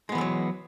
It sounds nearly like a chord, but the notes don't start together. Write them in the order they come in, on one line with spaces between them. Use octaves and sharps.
G#3 B3 E3 A3 F#3